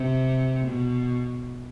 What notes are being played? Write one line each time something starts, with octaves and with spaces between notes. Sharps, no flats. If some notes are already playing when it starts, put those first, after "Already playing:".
Already playing: C3
B2